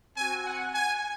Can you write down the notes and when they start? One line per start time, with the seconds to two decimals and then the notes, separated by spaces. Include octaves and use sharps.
0.15 C4 F#4 G#5
0.44 F#5
0.73 G#5